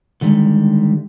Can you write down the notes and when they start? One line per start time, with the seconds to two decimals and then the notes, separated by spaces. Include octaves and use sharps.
0.21 D3 D#3 G3 G#3